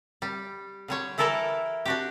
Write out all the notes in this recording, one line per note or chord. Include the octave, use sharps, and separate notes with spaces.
G3
D3 G3 C#5
E3 E4 A4 A#4 D5 A5
D4 F#4 G4